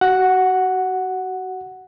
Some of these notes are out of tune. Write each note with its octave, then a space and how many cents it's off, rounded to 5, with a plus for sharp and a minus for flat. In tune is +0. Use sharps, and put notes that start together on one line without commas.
F#4 +30 F#5 +0